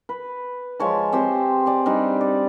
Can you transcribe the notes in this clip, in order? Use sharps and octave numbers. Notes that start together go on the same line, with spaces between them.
B4
F3 G#3 C#5 A5
C4 G4 C5
D5 G#5
G3 D4 D#4
D5